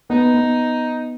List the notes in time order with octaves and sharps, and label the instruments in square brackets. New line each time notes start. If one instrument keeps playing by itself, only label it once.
[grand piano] B3 [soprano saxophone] D#4
[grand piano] B3